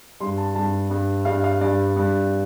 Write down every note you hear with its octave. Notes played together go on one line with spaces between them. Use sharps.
G2 G3 C6
A5
G2 G3 A5
G2 G3
G2 G3 F5
F5
G2 G3 D5
G2 G3